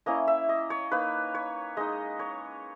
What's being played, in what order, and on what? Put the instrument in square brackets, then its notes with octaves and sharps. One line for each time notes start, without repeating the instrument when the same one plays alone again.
[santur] A#3 C#4 E4 D#5
E5
D#5
C#5
A#3 D#4 B4
C#5
G#3 D#4 D#5
C#5